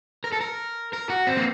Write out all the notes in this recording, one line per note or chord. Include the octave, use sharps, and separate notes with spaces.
A#4
A4
A#4
A#4
F#4
C4
A#3